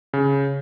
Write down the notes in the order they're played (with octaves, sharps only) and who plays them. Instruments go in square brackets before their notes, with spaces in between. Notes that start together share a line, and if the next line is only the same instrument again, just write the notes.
[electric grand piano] C#3